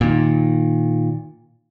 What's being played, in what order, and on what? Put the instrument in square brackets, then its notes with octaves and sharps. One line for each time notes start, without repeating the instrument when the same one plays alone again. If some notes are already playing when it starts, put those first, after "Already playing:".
[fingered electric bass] A#2 D#3